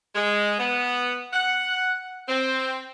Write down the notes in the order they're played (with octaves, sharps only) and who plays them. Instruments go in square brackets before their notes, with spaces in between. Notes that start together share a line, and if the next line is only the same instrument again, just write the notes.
[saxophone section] G#3
B3
F#5
C4